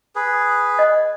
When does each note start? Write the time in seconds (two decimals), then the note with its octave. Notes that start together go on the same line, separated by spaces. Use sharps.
0.16 G#4 B4
0.79 D#5